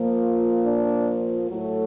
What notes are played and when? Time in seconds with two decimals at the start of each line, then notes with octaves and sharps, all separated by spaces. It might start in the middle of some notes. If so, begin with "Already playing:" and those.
Already playing: A#2 F3 A#3
0.64 D4
1.48 A2 F#3 A3